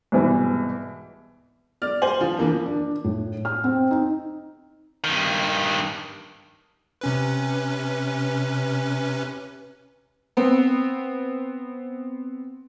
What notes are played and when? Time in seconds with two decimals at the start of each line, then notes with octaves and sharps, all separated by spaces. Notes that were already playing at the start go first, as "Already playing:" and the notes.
0.12 C2 G#2 B2 E3
1.82 D5 F6
2.02 C5 G#5 F#7
2.21 F3
2.37 E3 F3 A#3 D4
2.66 D4
3.04 A2
3.45 F6
3.64 C4
3.91 D#4
5.04 G2 D#3
7.01 C3 C#4 B4
10.37 B3 C4